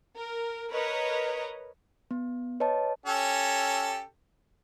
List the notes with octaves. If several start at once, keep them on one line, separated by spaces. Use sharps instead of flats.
A#4
A#4 B4 C#5 D#5 A#5
B3
B4 C#5 D#5 A5
C#4 G4 A4